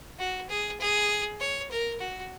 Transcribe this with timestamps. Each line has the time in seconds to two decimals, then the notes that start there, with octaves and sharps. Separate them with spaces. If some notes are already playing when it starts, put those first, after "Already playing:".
0.19 F#4
0.49 G#4
0.80 G#4
1.40 C#5
1.71 A#4
2.00 F#4